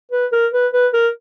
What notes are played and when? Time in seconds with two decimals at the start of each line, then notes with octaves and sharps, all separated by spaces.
0.12 B4
0.32 A#4
0.53 B4
0.73 B4
0.94 A#4